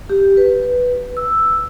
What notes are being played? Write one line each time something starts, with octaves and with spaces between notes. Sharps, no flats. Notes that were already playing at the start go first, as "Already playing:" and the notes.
G4
B4
E6